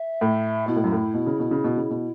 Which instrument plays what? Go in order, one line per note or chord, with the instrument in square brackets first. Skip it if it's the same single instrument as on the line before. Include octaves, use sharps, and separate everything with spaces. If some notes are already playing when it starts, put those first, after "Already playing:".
Already playing: [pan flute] E5
[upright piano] A2
[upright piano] B2 [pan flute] E4
[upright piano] A2
F#2
A2
B2
C#3
B2
C#3
B2
C#3
B2